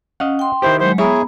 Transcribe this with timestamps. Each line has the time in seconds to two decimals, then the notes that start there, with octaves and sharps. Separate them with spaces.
0.20 C#4 D#5 F5 F#5
0.39 G5 C6
0.62 D#3 E4 G4 C5
0.80 F#3 G#3 C5
0.98 B3 E4 G#4 C#5 E5 A#5 B5